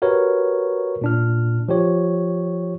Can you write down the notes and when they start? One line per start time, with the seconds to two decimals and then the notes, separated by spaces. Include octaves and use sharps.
0.02 F#4 G4 A#4 B4 C#5
1.01 A#2 D4 F6
1.68 F3 G4 C#5